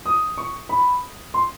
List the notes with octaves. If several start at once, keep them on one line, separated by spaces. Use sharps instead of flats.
D#6
C#6
B5
C6